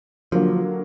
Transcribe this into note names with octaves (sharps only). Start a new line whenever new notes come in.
D3 F3 F#3 A#3